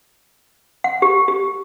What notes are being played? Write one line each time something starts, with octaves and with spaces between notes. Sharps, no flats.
F#5
G4
G4